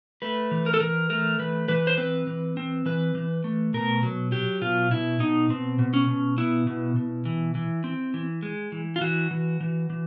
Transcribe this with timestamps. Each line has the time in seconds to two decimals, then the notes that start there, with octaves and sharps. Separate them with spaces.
0.22 A3 B4
0.51 E3
0.66 A#4
0.74 A4
0.80 E3 A#4
1.10 A3 A#4
1.39 E3 B4
1.68 E3 B4
1.87 C5
1.97 C4 B4
2.27 E3
2.57 C4
2.86 E3 B4
3.15 E3
3.44 A3
3.74 B2 A#4
4.03 F#3
4.32 F#3 G4
4.61 B2 F4
4.91 B2 E4
5.20 B2 D#4
5.50 B2 C4
5.79 B2
5.94 C#4
6.08 B2
6.38 B3 E4
6.67 B2
6.96 B2
7.25 E3
7.55 E3
7.84 C4
8.14 E3
8.43 G#3
8.72 E3
8.96 F4
9.01 E3 F#4
9.31 E3
9.61 E3
9.90 E3